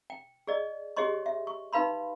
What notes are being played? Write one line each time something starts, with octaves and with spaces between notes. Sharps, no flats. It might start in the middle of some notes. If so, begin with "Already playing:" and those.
G5
G#4 D5 D#5
G4 G#4 C#5 D#5 C6 C#6
E5
C#6
D#4 B4 F5 B5 C6